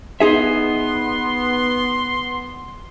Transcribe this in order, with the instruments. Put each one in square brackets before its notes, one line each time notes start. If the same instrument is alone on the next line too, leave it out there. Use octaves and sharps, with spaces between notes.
[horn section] B3 [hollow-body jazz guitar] D#4 G#4 E5 [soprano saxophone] C6